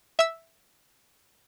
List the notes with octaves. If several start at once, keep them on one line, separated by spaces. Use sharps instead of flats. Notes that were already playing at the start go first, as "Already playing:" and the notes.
E5 E6